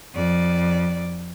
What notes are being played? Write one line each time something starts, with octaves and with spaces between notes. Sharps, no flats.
F2 D5